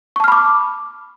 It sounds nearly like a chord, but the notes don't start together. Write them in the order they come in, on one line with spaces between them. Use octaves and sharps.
C#6 A5 F6 B5 D6